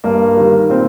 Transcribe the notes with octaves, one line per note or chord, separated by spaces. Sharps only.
G2 A#3
D#3 G3
A#2 C4